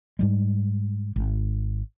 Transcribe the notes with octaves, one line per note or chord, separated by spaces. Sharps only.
G#2 G3 G#3
G#1